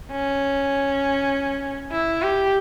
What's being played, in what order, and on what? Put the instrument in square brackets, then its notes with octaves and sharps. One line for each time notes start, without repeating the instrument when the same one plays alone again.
[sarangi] C#4
E4
G4